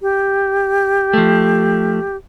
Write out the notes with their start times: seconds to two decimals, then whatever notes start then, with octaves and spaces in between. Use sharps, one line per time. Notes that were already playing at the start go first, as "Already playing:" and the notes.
0.01 G4
1.13 F3 A3